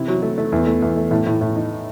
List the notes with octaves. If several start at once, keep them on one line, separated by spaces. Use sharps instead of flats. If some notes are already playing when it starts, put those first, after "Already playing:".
Already playing: C3 E4
F#3
A3
A3
E2
A3
E2
A3
A2
A2
A2
D#4